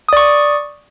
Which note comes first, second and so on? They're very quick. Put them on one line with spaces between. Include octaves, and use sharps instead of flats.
D#6 D5 C#6